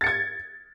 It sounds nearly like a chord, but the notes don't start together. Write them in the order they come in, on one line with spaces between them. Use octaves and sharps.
A6 C#7 G#6